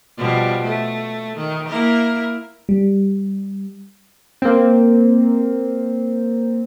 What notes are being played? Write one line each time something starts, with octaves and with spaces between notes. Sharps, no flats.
B2 F3 G3
A3
D#3
A#3 E4 A#4
G3
A#3 C4